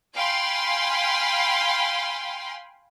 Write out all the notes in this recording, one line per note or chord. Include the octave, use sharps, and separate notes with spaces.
F5 G5 G#5 B5 C6